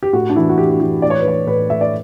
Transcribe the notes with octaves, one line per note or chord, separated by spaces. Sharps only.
G4
A2 F#4
D4
E3 E4
F#4
E3 G4
F#4
E3 G4
A2 D5
C#5
B4
E3 C#5
A2 B4
A2 E5
D5